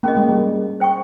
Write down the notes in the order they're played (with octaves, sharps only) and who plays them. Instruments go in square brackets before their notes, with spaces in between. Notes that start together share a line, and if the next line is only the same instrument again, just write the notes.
[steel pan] A#3 [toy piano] C#4 G#4 D#5
[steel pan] G#3
G3
[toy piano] C5 G5 C#6